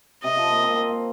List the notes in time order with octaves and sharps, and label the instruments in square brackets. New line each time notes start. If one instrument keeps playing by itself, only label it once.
[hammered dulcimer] C3 [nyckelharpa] D#5
[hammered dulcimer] F3
A#3
C4
A#3
C4
A#3